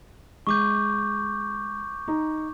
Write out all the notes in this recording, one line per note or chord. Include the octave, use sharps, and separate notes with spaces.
G#3 C#6 D6 G6
D#4